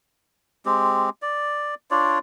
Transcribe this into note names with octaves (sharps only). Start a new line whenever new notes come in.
G#3 C4 G4
D5
D4 F4 C#5 D5